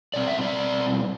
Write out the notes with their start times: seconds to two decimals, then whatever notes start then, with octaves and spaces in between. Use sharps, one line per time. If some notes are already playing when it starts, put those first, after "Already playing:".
0.14 B2 G3 C4 D5
0.28 E5
0.41 D5